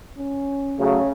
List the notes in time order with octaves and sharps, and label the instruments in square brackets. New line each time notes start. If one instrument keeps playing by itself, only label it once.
[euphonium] C#4
[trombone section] C#3 [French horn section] F#3 A3